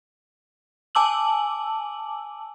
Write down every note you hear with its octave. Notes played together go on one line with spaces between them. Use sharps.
G#5 A5 D6 E6 F#7